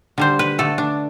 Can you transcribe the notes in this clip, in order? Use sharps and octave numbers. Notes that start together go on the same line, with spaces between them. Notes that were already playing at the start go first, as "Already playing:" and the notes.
D3 G3 C5
B4
D3 A3 A4
D4